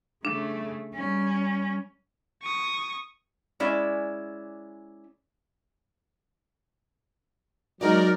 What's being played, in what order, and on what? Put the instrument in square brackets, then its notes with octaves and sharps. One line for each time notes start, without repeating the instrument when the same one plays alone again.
[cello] C#3 A3 [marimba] D4
[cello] G3 C#4
[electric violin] C#6 D#6
[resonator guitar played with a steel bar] G#3 C#4 E4 D5
[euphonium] F#3 [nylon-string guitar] G#3 F#4 [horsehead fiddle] D#4 [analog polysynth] A#4 D5